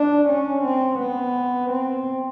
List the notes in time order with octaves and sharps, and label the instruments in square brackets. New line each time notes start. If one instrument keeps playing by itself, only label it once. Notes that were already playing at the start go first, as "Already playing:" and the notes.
Already playing: [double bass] D4
C#4
C4
B3
C4